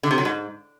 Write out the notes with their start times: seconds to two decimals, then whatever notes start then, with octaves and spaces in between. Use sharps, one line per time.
0.03 D3
0.11 C3
0.18 F#3
0.25 G#2